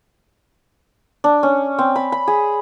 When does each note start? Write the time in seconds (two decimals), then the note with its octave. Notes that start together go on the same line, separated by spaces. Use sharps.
1.24 D4
1.43 C#4
1.78 C4
1.96 B5
2.12 B5
2.28 G#4